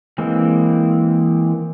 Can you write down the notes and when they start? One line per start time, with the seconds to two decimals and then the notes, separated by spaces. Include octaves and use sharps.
0.18 E3 G#3 A#3 C4